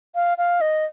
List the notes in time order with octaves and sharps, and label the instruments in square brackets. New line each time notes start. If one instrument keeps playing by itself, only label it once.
[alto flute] F5
F5
D#5